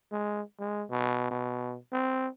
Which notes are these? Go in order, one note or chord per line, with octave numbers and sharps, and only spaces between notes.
G#3
G#3
B2
B2
C4